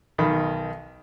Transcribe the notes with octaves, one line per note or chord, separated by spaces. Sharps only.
B1 D#3 B5